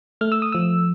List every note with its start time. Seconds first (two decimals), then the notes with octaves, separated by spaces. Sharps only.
0.21 A3 F6
0.32 E6
0.42 D#6
0.52 F3 E6